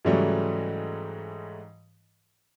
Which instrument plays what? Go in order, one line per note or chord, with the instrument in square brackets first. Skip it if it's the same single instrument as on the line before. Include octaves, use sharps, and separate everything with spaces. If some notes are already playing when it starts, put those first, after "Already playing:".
[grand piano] G#2 C#3 E3 F#3 G3 A3